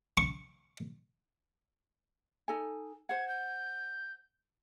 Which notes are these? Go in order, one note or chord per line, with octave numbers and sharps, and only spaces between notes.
C#6
D#4 A4 G#5
C5 F#5 G#6
G6